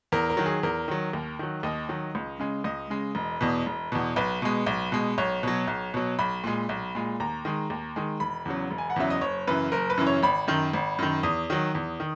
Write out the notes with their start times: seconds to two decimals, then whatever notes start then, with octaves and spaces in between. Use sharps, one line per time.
0.12 E2 A#4
0.30 A#4
0.37 D#3 F#3
0.46 G#4
0.63 E2 A#4
0.88 D#3 F#3
1.13 D#2
1.39 D#3 F#3
1.63 D#2 D#5
1.89 D#3 F#3
2.15 C#2
2.39 C#3 G#3
2.64 C#2 D#5
2.90 C#3 G#3
3.15 E1
3.41 E2 B2
3.66 E1
3.92 E2 B2
4.16 B1 B4
4.42 B2 G#3
4.66 B1
4.92 B2 G#3
5.18 B1 C#5
5.43 B2 F#3
5.67 B1
5.94 B2 F#3
6.19 B1 B5
6.44 A#2 G#3
6.69 B1
6.95 A#2 G#3
7.20 D#2 A#5
7.45 D#3 G#3
7.70 D#2
7.96 D#3 G#3
8.20 E1 B5
8.45 E2 C#3 F#3
8.71 E1
8.78 G#5
8.90 F#5
8.96 E2 C#3 F#3 E5
9.10 D#5
9.21 F#1 C#5
9.47 F#2 C#3 E3 B4
9.72 F#1 A#4
9.90 B4
9.97 F#2 C#3 E3
10.07 C#5
10.23 G#1 B5
10.48 F#2 D#3
10.73 G#1
10.98 F#2 D#3
11.23 E2 D#6
11.50 D#3 F#3
11.75 E2
12.00 D#3